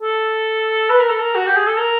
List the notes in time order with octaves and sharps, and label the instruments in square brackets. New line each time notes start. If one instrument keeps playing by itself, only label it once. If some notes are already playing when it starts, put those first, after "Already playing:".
[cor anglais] A4
B4
A#4
A4
A#4
F#4
G4
G#4
A4
A#4